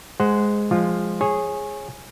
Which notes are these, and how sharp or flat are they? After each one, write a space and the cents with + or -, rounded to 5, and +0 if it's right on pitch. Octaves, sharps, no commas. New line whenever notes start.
G#3 +0 C5 -15 F#5 +0
F3 +0 G#3 -15 F4 +0
G#4 +0 C#5 -25